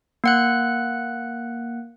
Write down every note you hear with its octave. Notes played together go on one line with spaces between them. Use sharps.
A#3 F#5 F#6